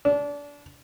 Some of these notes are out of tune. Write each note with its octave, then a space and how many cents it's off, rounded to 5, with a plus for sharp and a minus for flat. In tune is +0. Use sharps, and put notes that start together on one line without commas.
D4 -25